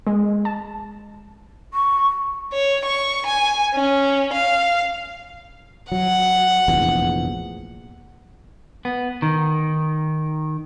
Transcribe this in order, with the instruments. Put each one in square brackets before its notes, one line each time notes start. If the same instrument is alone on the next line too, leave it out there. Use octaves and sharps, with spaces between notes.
[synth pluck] G#3
A5
[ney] C#6
[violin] C#5
C#6
G#5
C#4
F5
[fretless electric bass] F#3 [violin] F#5
[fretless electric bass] F1 A#1 E2
[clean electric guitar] B3
D#3